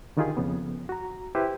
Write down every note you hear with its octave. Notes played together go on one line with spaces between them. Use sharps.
D3 D#3 D#4 F4 G4 G#4
F2 C#3 B3
F#4 A#5
E4 G4 B4 C5